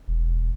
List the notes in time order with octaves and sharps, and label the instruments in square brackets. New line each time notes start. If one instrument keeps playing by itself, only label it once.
[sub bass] E1